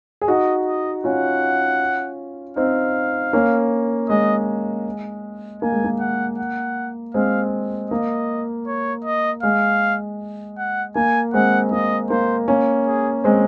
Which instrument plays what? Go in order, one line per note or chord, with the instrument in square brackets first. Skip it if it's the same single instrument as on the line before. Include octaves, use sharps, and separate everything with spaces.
[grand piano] G#4
[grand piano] D#4 F#4 [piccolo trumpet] D#5
[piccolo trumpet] D#5
[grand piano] C#4 F4 [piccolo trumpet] F#5
[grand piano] C4 D#4 [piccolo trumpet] F5
[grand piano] A#3 C#4
[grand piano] G#3 [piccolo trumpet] D#5
[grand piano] A#3 [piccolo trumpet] G#5
[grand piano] G#3
A#3
[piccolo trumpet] F#5
F#5
[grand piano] G#3 C4 [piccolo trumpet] F5
[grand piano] A#3 [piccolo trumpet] D#5
[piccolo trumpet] C#5
D#5
[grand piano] G#3 [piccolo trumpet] F5
[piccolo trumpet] F#5
[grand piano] A#3 [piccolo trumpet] G#5
[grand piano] G#3 C4 [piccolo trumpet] F#5
[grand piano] A#3 [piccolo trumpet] D#5
[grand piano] A#3 [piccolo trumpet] C5
[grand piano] A#3 C#4
[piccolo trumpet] G#4
[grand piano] G#3 C4